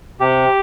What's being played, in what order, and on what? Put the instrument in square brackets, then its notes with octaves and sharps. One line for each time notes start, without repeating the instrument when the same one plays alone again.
[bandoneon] C3 G4